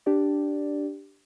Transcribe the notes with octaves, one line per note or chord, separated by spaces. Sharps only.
D4 G4 D5